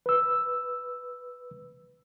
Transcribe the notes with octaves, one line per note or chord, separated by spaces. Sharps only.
B4 E6